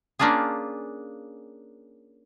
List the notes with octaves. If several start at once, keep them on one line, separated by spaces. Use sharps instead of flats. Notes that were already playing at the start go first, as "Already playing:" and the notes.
A#3 C#4 D4 F4 G#4